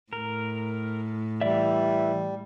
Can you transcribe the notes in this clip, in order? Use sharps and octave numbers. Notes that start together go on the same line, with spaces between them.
A2 A#4
E3 G3 D5 E5